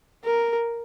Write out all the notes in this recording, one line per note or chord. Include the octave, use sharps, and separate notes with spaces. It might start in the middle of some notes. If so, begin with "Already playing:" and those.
A#4